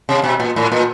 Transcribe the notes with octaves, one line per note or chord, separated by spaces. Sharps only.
C3
B2
A#2
A2
A#2